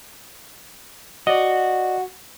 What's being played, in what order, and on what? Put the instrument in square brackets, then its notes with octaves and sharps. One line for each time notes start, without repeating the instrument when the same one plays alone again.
[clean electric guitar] F#4 [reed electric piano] D5 D#5